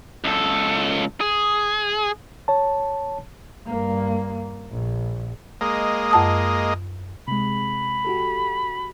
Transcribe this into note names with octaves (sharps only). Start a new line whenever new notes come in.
C#2 A4
G#4
C#5 A5
G2 A#3
A#1
G#3 A#3 D#5
F#2 A5 D#6
C3 G#3 B5
F#4 G4 A4